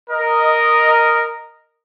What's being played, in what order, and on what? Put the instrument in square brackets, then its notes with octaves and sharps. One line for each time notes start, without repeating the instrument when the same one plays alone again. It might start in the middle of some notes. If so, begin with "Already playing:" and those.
[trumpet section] A#4 D#5